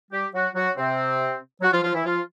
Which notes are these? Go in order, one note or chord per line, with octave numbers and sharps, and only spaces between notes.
G3 G4
F#3 F#4
F#3 F#4
C3 C4
F#3 F#4
F3 F4
F3 F4
E3 E4
F3 F4